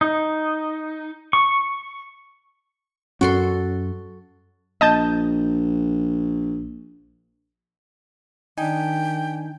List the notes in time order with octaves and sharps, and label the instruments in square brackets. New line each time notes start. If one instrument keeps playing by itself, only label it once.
[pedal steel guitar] D#4
C#6
[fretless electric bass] F#2 F#3 C#4 [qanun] F#4 A4 C6
[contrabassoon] A#1 [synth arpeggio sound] D#5 A5 G6
[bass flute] D#3 [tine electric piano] D4 G#5 [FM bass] D#4 [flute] G5